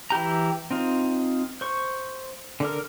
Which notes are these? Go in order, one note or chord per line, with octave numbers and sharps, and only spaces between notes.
E3 E4 G4 A#5
C4 D#4 F4
C5 C#6
D3 A#4